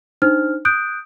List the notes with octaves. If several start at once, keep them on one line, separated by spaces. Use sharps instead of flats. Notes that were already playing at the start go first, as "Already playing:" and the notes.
D4 D#4 C5 F6
D#6 F#6 G6 D7